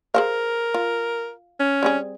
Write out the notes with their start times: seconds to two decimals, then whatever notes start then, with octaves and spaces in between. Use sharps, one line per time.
0.14 G#4 A#4 C5 F5
0.74 F4
1.60 C#4
1.83 G3 C4 G#4